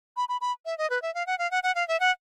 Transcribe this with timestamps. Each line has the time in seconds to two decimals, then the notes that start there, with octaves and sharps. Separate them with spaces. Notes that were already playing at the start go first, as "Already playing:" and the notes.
0.17 B5
0.29 B5
0.41 B5
0.66 E5
0.78 D#5
0.90 B4
1.02 E5
1.14 F5
1.27 F#5
1.39 F5
1.51 F#5
1.63 F#5
1.75 F5
1.88 E5
2.00 F#5